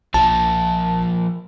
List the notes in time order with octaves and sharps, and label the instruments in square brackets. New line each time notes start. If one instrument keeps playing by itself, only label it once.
[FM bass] B1 [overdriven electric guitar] F3 A#3 [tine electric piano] A5